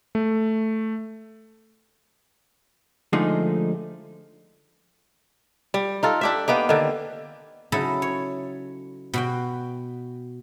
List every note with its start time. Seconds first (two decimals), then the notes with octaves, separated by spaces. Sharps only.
0.15 A3
3.13 D3 F3 G#3 A3 D#4
5.74 G3
6.03 D#4 F4 A4
6.21 D4 G4 E5
6.48 A#3 B3 D#4 G4
6.69 D3 D#3
7.72 C#3 F#3 D#4 E4 A4
8.02 C#5
9.14 B2 F#4 G5